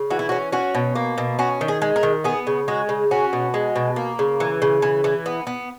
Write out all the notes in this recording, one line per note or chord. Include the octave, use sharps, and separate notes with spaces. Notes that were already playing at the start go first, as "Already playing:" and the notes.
Already playing: C#3
E3 F#4
E4
C#4 F#4
C#4 F#4
B2
A#3
B2
C#4 F#4
D#3
G#4
G#3
A#4
D#3
B3 G#4
C#3
G#3 F#4
C#3
C#4 F#4
B2
G#3
B2
A#3
C#3
E3
C#3
E3
E3
B3
B3